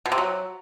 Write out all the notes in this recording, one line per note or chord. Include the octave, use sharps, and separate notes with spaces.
B2
C3
F#3